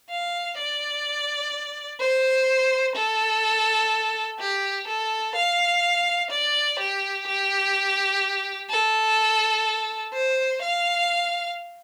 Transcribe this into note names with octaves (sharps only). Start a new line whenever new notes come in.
F5
D5
C5
A4
G4
A4
F5
D5
G4
G4
A4
C5
F5